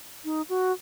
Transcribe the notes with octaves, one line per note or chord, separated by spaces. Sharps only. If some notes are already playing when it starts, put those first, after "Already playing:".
D#4
F#4